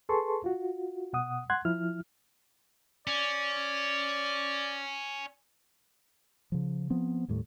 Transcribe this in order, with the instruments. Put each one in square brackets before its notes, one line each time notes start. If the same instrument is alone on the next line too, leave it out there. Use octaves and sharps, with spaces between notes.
[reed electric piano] G#4 A4 B4 A5 C6 C#6
F4 F#4
B2 F#5 D#6
F#5 C6 F#6 G#6
F3 E4 F6
[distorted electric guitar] C#4 [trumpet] D5
[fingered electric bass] C#3 F3
F3 B3 C4
D#2 A2 G3 A3